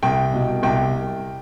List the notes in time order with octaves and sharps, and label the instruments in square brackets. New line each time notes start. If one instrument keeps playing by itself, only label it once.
[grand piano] C2 G5
B2
C2 G5